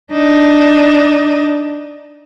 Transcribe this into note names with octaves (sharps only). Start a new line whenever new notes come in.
D4 D#4